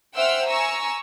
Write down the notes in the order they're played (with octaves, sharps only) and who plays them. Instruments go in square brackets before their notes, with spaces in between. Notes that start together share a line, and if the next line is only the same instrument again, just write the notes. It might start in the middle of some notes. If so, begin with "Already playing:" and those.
[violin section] C5 E5 F#5 G5 E6 F6
G#5 A#5 C#6 E6